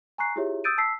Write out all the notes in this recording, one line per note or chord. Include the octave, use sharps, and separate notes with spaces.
G#5 A#5 C#6 F#6 C7
E4 F4 G4 G#4 C#5 E5
D#6 E6 G6 A6 D7 D#7
A5 E6 B6 C7